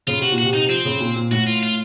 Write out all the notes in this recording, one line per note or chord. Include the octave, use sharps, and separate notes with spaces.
C#3 F4
C3 F#4
A#2
F#4
C3
D#4
F3 C4
C#3
A#2
A#2
A2 F#4
F4
F4